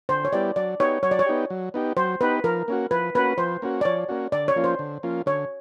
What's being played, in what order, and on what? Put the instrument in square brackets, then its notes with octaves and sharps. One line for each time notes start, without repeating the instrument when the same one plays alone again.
[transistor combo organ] D3 [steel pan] C5
[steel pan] C#5
[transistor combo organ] G3 B3 E4 G4 [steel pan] D5
[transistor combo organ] F#3 [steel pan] D5
[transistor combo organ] B3 D#4 G4 [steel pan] C#5
[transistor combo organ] F#3 [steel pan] C#5
[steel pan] D5
C#5
[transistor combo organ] B3 D#4 G4
F#3
B3 D#4 G4
[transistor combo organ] F#3 [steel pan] C5
[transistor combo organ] B3 D#4 G4 [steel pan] B4
[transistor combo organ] F3 [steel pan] A#4
[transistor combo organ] A#3 C#4 F#4
[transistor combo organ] F3 [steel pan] B4
[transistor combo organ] A#3 C#4 F#4 [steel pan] B4
[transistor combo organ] F3 [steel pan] C5
[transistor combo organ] A#3 C#4 F#4
[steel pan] D5
[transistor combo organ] F3 [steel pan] C#5
[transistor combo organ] A#3 C#4 F#4
[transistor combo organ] D3 [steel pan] D5
[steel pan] C#5
[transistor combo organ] F3 A#3 C#4 F4
[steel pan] C5
[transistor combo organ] D3
F3 A#3 C#4 F4
[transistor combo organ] D3 [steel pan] C#5